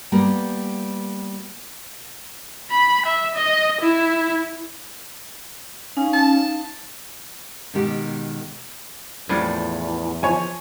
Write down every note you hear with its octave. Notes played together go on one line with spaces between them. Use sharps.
G3 A#3 B3
B5
E5
D#5
E4
C#4 D#4 F5
A5
B2 D#3 G#3 G4
E2 A2 F3 G3 D4
F3 C#5 G#5